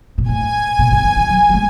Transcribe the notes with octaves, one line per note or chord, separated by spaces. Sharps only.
B2
A2 G#5
B2
C#3
D#3
E3
F#3
F#3
G#3